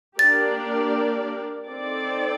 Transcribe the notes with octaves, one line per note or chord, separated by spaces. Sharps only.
A#3 D4 G4 A#4 D5 A6
C4 D#4 A4 D5